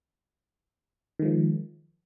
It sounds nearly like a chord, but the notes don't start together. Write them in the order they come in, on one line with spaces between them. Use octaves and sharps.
D#3 G#3 F3